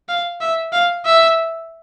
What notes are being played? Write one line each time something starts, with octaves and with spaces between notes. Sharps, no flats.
F5
E5
F5
E5